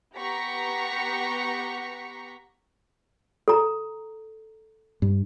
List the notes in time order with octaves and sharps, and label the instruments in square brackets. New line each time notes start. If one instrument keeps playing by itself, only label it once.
[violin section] B3 G4 F#5 A#5 C#6 B6
[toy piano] A4 A#5
[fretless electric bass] G2